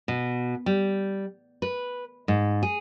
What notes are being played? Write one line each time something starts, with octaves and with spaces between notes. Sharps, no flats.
B2
G3
B4
G#2
G#4